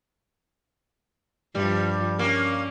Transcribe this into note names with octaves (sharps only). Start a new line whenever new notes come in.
G2 F3 G3
A#3 C#4